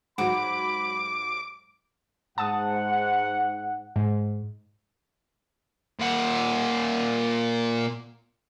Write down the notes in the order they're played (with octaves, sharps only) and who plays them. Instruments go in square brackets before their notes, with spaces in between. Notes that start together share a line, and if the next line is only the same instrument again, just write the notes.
[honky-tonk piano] G#2 F#3 [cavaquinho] F#4 [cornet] B5 [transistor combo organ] D6
[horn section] G#2 F#5 [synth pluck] A5 D#6
[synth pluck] G#2
[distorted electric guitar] A#2 F#5